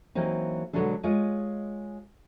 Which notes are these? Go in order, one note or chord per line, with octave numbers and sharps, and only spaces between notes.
E3 F#3 A#3 C4 D#4
B2 D3 F#3 G#3 D4 A4
G#3 F4 C#5 D#5